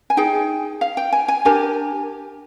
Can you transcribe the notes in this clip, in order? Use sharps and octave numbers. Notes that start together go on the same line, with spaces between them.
G#5
D#4 G#4 G5
F5
G5
G#5
G#5
D4 G4 A#4 G#5